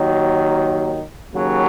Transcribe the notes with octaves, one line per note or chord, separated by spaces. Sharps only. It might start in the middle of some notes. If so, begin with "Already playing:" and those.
Already playing: D#2 D#3 F#3
D#2 C#3 F#3